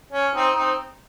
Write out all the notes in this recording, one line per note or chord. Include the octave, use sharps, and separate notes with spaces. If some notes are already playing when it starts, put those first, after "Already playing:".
C#4
C4 D#4
C4 D#4